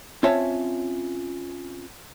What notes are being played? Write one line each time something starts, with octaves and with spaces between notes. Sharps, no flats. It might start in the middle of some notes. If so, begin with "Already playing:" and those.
C4 C#4 F4 C#5 E5 A5